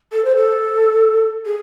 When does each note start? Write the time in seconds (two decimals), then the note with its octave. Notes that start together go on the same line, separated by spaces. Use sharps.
0.12 A4
0.25 C5
0.36 A4
1.45 G#4